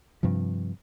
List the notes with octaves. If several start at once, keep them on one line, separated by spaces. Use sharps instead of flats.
G2 C3 F3